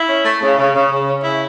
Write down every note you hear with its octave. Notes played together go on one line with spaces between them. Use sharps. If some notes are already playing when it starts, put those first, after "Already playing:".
Already playing: E4
C#4
A3
C#3
C#3
C#3
C#3
C#4
C#3 E4